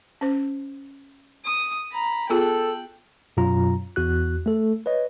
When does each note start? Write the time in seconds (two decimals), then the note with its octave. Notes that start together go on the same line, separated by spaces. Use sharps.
0.21 C#4 C5
1.45 D#6
1.92 A#5 B5
2.30 B3 F4 G#4 A4 G5 F#6
3.37 F#2 B2 F#3 F4 A#5
3.96 E2 F#4 F#6
4.46 A3 A4
4.86 B4 C#5 D#5